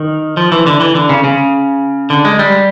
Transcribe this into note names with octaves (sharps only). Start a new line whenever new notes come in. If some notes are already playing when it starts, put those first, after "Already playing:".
Already playing: D#3
F3
E3
D3
E3
D3
C#3
C#3
D3
G#3
G3